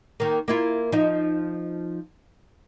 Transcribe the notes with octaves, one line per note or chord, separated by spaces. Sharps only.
D#3 A#3
A#3 E4 F4
F3 D#4